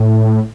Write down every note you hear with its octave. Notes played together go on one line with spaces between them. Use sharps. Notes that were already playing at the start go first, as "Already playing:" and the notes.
Already playing: A2